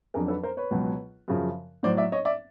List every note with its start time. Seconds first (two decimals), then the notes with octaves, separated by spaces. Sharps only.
0.14 F2 D3 F#3 G#4 A#4
0.28 A4 B4
0.43 A#4 C5
0.57 B4 C#5
0.71 C#2 B2 F#3
1.28 F#2 C#3 F3
1.83 A2 F#3 C5 D5
1.97 D5 E5
2.12 C#5 D#5
2.25 D5 E5